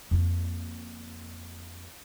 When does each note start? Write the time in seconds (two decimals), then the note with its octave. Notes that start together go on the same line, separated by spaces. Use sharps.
0.11 F2 A#3